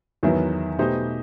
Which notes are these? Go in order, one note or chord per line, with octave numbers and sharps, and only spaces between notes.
E2 D#3 F#3 B3 E4
B2 A3 D#4 G4 C5